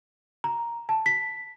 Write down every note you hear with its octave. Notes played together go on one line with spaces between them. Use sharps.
A#5
A5
B6